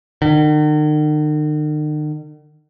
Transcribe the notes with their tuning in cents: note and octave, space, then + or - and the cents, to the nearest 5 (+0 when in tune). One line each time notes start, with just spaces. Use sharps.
D#3 -45